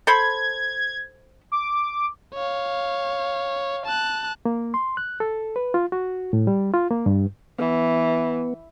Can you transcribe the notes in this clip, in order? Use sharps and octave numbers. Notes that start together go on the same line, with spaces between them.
A4 C5 B5 G#6
D6
C#5 F5
A5 F#6
A#3
C6
F#6
A4
B4
F4
F#4
A2
G3
F4
A#3
G2
E3 B3